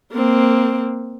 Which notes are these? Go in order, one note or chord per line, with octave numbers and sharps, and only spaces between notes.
A#3 C4